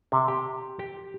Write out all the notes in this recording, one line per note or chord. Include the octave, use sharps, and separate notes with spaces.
C3
G4
G4